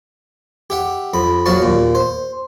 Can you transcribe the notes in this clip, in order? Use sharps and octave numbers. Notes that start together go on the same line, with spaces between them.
G4 E5 F#5
F2 B5
A#1 F3 F#3 F5 A5 C#6
D#2 A#2
C5